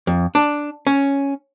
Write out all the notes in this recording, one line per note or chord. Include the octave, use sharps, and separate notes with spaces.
F2
D4
C#4